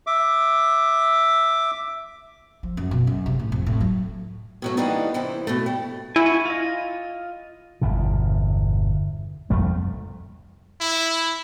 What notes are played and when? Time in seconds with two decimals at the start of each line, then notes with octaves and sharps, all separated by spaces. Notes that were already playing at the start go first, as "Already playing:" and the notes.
0.07 E5 D6
2.63 F3
2.77 F#2
2.91 B2
3.07 F#2
3.26 C3
3.39 A2
3.52 F2
3.66 A2
3.81 F#3
4.62 B2 F#3 A3
4.77 E3 G3 A#3 B3 D4 D#4
5.14 C3 E3 E4 C5
5.47 B2 A3
5.66 G3
6.16 E4 F#4 G#5
6.46 F4 D#5
7.81 G1 E2 B2
9.50 C2 F2 G3 A3
10.81 E4